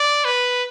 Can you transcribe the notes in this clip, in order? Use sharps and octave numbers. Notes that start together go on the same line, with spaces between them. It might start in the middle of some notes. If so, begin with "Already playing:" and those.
Already playing: D5
B4